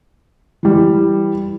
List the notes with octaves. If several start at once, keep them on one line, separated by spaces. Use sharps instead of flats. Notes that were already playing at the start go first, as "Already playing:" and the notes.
E3 G3